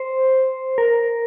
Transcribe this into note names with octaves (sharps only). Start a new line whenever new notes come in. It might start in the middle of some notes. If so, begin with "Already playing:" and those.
Already playing: C5
A#4